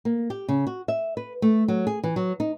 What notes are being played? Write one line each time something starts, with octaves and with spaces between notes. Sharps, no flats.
A#3
G4
C#3
F#4
E5
B4
A3
F#3
G#4
E3
F#3
D#4